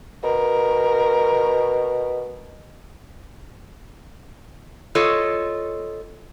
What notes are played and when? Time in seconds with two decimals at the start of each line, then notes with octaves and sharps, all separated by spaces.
0.24 B2 A#4
4.95 F4 A4 C#5 D#5